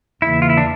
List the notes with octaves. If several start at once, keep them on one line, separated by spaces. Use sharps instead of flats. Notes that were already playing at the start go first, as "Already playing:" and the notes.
E2 C#3 E3 A#3 E4
F4
E4
D4